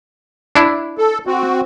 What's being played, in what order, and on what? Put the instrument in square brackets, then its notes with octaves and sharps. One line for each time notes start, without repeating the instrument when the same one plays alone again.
[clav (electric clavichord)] D4 E4
[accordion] A4
C4 F#4